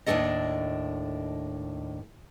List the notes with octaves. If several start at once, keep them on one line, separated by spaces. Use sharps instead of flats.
D#2 A2 F#3 D4 A4 D#5